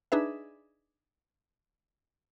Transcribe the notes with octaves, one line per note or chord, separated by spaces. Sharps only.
D4 D#4 G#4 B4 E5